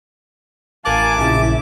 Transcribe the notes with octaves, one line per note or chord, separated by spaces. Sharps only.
A1 A#4 F5 G#5 A5 D6 F#6
A#1 C#3 E4 E5